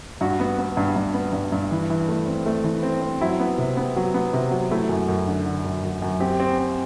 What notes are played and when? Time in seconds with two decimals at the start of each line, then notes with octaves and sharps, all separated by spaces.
0.21 G2 F#4
0.40 B3
0.58 B3
0.77 G2
0.96 G2
1.14 B3
1.33 G2
1.52 G2
1.71 E3
1.90 E3
2.08 A3
2.27 C4
2.46 A3
2.64 E3
2.83 C4
3.01 C4
3.21 F#3 E4
3.40 B3
3.58 C3
3.77 B3
3.96 F#3
4.14 B3
4.33 C3
4.51 F#3
4.71 A3 E4
4.89 F#2
5.08 F#2
5.27 D3
5.46 D3
5.65 F#2
5.83 F#2
6.02 F#2
6.20 C4 G4
6.40 C4
6.58 C4